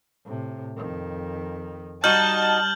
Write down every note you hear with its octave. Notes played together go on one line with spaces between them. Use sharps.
A2 C3
F2 D#3
G3 D#4 F#4 A5 F6 G6 F#7